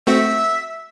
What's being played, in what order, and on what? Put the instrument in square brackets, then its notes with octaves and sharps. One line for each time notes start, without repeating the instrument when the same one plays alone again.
[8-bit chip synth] A3 C4 F#4 [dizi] E5